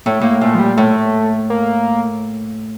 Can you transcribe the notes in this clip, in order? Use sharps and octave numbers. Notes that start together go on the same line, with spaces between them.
A2 A3
A2 A#3
A#2 A3
F3
G3
A2 A3
A#3